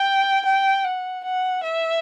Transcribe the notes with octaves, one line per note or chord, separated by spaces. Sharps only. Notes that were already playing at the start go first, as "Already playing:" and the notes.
Already playing: G5
G5
F#5
F#5
E5